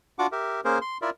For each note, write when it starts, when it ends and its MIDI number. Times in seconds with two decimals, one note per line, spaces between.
0.19 0.27 62
0.19 0.27 65
0.19 0.27 66
0.19 0.27 78
0.19 0.27 86
0.32 0.61 67
0.32 0.61 70
0.32 0.61 76
0.65 0.79 58
0.65 0.79 61
0.65 0.79 68
0.65 0.79 70
0.65 0.79 72
0.81 0.98 84
1.02 1.10 64
1.02 1.10 65
1.02 1.10 70
1.02 1.10 74
1.02 1.10 76